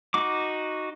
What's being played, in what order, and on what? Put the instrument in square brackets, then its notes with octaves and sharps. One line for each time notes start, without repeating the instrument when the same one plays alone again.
[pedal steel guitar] D#4 F#4 D6